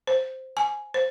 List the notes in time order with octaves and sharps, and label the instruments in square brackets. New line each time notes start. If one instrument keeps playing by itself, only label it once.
[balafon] C5
G#5
C5